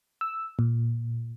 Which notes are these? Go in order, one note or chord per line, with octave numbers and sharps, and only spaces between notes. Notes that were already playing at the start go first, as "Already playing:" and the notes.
E6
A#2